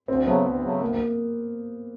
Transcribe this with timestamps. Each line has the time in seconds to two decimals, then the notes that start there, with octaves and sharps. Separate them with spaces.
0.08 D2 C4
0.26 C#3 F#3 A3 B3
0.45 D2
0.64 C#3 F#3 A3
0.81 D2 A#3
0.93 A#3